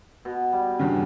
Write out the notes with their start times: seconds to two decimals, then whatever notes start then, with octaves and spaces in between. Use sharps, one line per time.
0.25 B2
0.52 G3
0.79 E2 G2 C#3